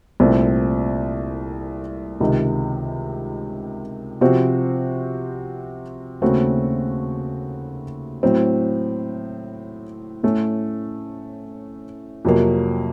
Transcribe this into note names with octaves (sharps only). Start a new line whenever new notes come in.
C2 A#2 A3 C4
C#2 C3 D#3
C3 F3 C4 F#4 C5
D#2 C#3 A3 C4 F#4
A2 F#3 C4
A2 A3 C#4
F2 C3 F#3 A#3